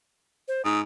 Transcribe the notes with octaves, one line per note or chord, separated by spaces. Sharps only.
C5
G#2 D#6